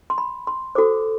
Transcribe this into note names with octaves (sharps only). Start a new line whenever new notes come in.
C6
B5
C6
F#4 A4 C5 D6